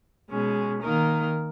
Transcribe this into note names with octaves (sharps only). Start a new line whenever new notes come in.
B2 G#3 C#4
D#3 A#3 D#4 A#4